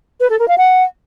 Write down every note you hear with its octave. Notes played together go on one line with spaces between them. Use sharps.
B4
A4
A#4
F5
F#5